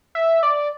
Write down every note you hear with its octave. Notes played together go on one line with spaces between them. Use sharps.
E5
D5